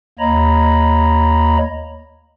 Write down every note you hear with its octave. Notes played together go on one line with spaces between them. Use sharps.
D#2 A#3 C#5 D#5 A#5 B5